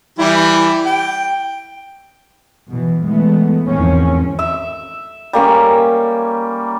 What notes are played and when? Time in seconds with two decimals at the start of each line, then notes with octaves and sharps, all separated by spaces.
0.19 E3 G3 E4
0.85 G5
2.71 B2 E3
3.06 E3 G#3 A3 B3
3.68 G#1 E2 D#3 F3 C4 C#4
4.39 E5
5.33 G3 A#3 C#4